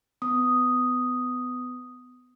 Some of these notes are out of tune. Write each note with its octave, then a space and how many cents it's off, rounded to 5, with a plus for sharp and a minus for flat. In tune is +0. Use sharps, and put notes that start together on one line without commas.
B3 +25 D#6 +0